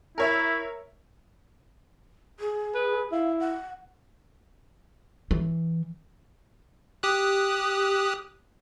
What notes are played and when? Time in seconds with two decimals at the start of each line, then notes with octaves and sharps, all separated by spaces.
0.18 E4 A#4 C#5 E5
2.40 G#4
2.75 B4
3.12 E4 F5
3.40 F#5
5.31 E3
7.03 G4 D#6 F#6